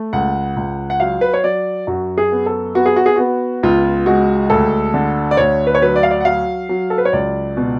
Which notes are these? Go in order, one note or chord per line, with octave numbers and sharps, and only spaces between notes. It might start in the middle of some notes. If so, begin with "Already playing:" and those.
Already playing: A3
C#2 F#5
C#2
F#5
F#3 F5
B4
C#5
F#3 D5
F#2 F#4
G#4
B3
A4
B3 F#4
G#4
F#4
G#4
B3 F#4
C#2 F4
G#3 F#4
D2 A4
D3
D5
D2 C#5
B4
C#5
F#3 B4
D5
F5
D5
F#5
F#3 F5
F#3
A4
B4
C#5
C#2 D5
B2